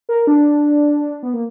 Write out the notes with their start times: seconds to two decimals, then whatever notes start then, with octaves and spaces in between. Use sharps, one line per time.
0.09 A#4
0.27 D4
1.23 B3
1.34 A#3